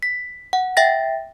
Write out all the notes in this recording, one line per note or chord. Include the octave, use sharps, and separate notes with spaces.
B6
F#5
E5 G5 A6 A#6